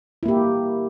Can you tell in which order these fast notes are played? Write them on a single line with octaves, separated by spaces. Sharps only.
E4 A#3 G4